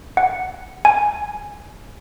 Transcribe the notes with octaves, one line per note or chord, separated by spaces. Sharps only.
F#5
G#5